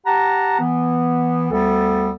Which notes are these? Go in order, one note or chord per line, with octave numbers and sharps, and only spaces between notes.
G4 F#5 A5 A#5
E3 B3
D2 G3 B3 A4